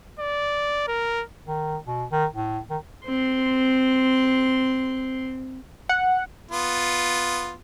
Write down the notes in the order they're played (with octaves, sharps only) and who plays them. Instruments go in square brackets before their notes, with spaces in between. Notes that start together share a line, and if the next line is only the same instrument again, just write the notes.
[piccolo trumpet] D5
A#4
[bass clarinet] D#3
B2
D#3
A2
D#3
[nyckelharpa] C4 C6
[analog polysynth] F#5
[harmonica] B3 F4